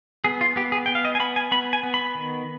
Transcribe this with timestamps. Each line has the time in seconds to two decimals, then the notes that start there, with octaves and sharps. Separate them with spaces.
0.24 B3 G#4
0.41 F4
0.56 B3 G4
0.72 G#4
0.86 B3 G5
0.95 F5
1.05 D#5
1.15 G#5
1.20 B3 B5
1.36 G#5
1.52 B3 B5
1.73 G#5
1.83 B3
1.94 B5
2.15 D#3